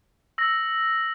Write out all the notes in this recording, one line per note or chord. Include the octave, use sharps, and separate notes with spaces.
E6 A#6